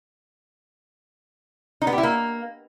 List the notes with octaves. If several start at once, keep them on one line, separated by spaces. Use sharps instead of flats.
D#4
B3
G4
E4
A#3